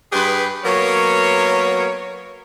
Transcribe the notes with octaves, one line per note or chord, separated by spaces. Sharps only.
G2 G4 G#4 B4
F#3 A#3 B3 A#4 C#5